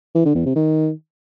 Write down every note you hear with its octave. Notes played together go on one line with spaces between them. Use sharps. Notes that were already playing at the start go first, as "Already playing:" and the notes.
E3
D3
E2
C3
D#3